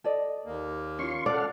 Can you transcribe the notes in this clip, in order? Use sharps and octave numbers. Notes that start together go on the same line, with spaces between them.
A4 D5 D#5
D#2 A#3
C#4 F4 C6 C#6
A4 D5 F#5 F6